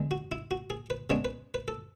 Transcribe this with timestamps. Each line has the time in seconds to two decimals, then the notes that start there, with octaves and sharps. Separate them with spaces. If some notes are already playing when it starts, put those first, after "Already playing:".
Already playing: E2 D3 G#3
0.11 F#4
0.32 E4
0.51 F#4
0.70 G#4
0.90 B4
1.10 C#3 G#3 B3 D4 C#5
1.25 B4
1.54 B4
1.68 A4